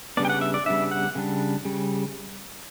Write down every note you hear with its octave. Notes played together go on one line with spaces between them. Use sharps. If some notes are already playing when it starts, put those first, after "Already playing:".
C#3 G3 B3 D4 D5
G5
F#5
E5
D5
C#3 G3 B3 D4 E5
F#5
C#3 G3 D4
C#3 G3